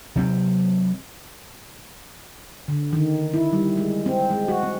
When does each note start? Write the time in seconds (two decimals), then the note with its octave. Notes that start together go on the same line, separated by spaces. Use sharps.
0.16 C3 F#3 C4
2.68 D3
2.93 D#3
3.34 E4
3.53 G3
3.77 G#3
4.06 C4
4.31 G#3
4.48 F#4
4.63 C4